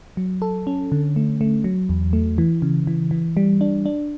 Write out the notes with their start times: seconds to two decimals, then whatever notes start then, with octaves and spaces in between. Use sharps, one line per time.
0.17 F#3
0.42 A4
0.67 C#4
0.92 D3
1.16 A3
1.41 A3
1.64 F#3
1.89 E2
2.13 A3
2.38 E3
2.62 C#3
2.87 E3
3.11 E3
3.37 G3
3.61 D4
3.86 D4